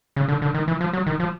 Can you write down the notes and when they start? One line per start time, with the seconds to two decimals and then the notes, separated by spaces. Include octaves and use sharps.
0.16 C#3
0.29 D3
0.42 D3
0.54 D#3
0.68 E3
0.81 F3
0.93 F#3
1.07 D#3
1.20 F3